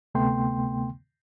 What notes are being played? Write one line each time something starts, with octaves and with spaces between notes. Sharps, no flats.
D2 C3 A3 B3 G5 C6